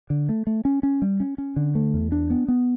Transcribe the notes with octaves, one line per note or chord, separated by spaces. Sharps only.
D3
A3
A3
C#4
C#4
G3
C#4
C#4
D3
A3
E2
D4
B3
B3